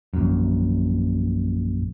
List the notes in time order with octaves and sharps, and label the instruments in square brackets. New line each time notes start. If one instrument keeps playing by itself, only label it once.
[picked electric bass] A#1 F#2